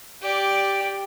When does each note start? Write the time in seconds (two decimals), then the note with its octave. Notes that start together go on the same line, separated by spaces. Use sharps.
0.22 G4 D5